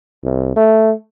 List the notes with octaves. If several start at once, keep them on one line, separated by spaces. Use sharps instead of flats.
C2
A3